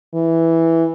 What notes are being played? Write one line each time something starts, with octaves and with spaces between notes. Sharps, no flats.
E3